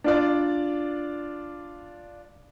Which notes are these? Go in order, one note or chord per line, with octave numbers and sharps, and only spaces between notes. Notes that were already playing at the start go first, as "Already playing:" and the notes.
D4 F4 D5